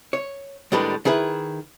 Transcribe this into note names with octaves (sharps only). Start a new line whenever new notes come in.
C#5
D#2 A2 G3 G#3 D4 B4
D#3 E4 G#4 B4